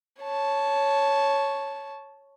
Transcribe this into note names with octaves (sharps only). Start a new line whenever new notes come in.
C#5 A5